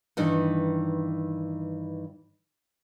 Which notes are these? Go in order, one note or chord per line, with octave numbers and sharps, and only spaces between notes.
G2 D#3 E3